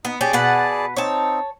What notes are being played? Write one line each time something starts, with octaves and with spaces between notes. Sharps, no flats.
B3 D#4
C#4 G4 G#4 D5 A5
B2 B4 F#5
C4 D#4 C#5 A5